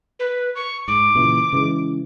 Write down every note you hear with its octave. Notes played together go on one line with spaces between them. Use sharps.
B4
C#6
G#2 D6
A#2 C#3 E3
C#3 E3 G#3